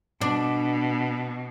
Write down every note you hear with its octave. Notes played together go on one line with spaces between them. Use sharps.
B2 D4